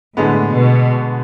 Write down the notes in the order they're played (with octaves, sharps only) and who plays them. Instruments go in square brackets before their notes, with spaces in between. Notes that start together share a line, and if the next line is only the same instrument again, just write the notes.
[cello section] A2 [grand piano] D3 G#3 B3
[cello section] B2